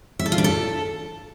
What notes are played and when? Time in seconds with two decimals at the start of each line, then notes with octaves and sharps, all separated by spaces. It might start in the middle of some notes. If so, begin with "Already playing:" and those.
0.19 E5
0.26 A4
0.32 F4
0.38 D4
0.44 A4